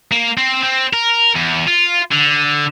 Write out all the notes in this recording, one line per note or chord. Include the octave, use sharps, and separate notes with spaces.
A#3
C4
C4
A#4
E2
F4
D3